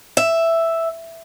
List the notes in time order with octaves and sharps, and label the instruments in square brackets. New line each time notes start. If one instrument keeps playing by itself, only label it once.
[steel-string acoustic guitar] E5